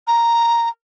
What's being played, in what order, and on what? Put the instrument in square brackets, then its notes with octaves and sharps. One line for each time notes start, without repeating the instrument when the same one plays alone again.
[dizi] A#5